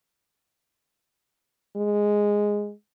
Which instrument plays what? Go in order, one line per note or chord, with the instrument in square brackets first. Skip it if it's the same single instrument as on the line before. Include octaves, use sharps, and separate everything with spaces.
[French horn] G#3